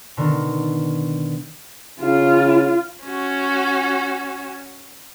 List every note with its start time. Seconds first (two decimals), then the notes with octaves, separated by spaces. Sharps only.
0.17 B2 D3 D#3 A#4
2.02 C#3 F4
3.04 C#4 F#4